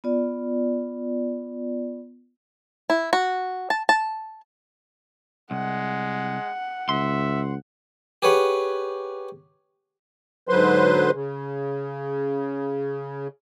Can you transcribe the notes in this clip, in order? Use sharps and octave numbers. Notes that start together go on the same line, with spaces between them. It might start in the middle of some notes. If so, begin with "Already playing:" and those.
B3 F4 D5
E4
F#4
A5
A5
C2 G#3 F#5
C#2 E5 C6
G4 G#4 B4 C#5 F#5
G#2 D3 F#3 B4 C5 C6
C#3